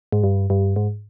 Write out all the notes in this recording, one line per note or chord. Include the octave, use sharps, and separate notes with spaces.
G#2
G2
G2
G#2